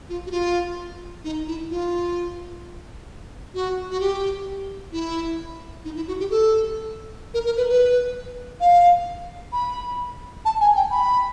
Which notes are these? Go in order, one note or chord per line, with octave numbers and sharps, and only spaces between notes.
F4
F#4
F4
D#4
E4
F4
F#4
F#4
G4
E4
D#4
E4
F#4
G4
A4
A#4
A#4
B4
B4
F5
B5
A5
G#5
G5
B5